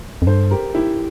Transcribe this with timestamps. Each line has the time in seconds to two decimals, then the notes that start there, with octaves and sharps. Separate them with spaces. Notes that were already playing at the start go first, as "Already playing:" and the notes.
0.22 F2
0.27 G2 A4 C5
0.51 G4 A#4
0.75 E4 G4